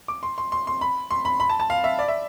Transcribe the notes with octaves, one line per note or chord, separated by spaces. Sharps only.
D6
C6
C6
C6
C6
B5
C6
B5
B5
A5
A5
F5
E5
D5
E5